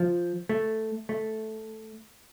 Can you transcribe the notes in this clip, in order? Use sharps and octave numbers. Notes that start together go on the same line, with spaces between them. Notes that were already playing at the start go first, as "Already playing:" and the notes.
Already playing: F3
A3
A3